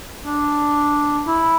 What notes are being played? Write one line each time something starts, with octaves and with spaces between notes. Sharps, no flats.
D4
E4